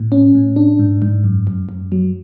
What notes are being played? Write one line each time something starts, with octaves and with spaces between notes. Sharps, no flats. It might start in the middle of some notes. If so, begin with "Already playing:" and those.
Already playing: A2
C#4
A2
D4
G#2
G#2
F#2
F#2
F#2
F#3